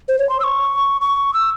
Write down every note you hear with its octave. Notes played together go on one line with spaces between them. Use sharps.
C5
C#5
C6
E6
C#6
C#6
E6